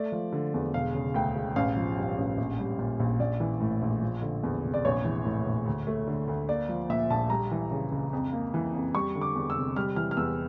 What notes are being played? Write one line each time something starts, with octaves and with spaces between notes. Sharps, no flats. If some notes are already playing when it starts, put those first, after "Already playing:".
Already playing: A3 D5
F3
D3
E2
E1 F5
C#3
D2 G5
E1
A1 F5
F3
G2
A1
A#1
G3
A#2
A#1
A#1 D5
E3
A2
A#1
F3
D3
E2
F1
D5
A#1 C#5
E3
A2
A#1
D2
A3
D3
D2
A#3 D5
F3
A#2 E5
A#1 A5
G3 A#5
E3
C#3
C#2
F2
A#3
E3
F2
G3 C#6
D3
D6
E2
E6
F1
G3 F6
E3 F6
F6
E2 E6